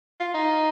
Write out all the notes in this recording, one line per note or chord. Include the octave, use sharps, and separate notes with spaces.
F4
D#4